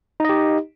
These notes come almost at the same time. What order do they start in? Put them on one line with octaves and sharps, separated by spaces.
D#4 D#5 G4